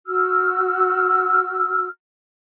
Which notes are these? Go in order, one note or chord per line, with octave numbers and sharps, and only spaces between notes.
F#4 E6 F6